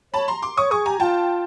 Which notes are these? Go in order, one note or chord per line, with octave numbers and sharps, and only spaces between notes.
C#5 A5 B5
A#5 C6
C6 D6
C#5 C#6 D#6
G#4 C#6 D#6
G4 G#5 A#5
F4 G5 A5